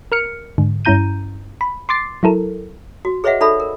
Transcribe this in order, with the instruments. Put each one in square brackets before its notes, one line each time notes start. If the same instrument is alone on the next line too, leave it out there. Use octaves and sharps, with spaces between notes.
[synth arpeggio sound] A#4 F6 C#7
G#2 D3
G2 C#4 E4 A#5 G6 D#7
B5
C6 D6 A6 C7
F#3 E4 A4 A#4
[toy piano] F#4
G#4 B4 C#5 D#5 E5 F#5
D#4 A4 D5 E5 B5
A#4